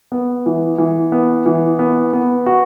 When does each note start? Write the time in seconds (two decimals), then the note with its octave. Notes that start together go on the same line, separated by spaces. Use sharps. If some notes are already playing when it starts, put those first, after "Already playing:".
0.12 B3
0.46 E3
0.78 E3
1.12 B3
1.46 E3
1.79 B3
2.13 B3
2.46 F#4